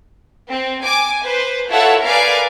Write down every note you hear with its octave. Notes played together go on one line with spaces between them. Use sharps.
C4
G#5 D6
B4 C5
E4 F4 A4 C#5 F#5 E6
A#4 B4 D5 F5 G#5 D6